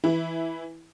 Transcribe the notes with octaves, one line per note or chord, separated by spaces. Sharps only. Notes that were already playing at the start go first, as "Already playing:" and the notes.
E3 E4